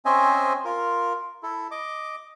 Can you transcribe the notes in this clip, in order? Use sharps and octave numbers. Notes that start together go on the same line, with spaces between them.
C4 C#4 C5 D#5 E5 G#5
F4 A#4
E4 A4
D#5 D6